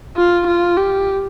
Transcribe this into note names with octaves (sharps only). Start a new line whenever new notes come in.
F4
F4
G4